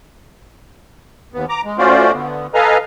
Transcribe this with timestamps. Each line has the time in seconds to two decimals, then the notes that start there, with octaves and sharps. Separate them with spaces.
1.34 D#2 B3
1.49 A#5 D6
1.65 G#3
1.78 A3 C#4 F4 F#4 C5 D5
2.14 D3 B3
2.54 A4 B4 D#5 F5 G#5 A#5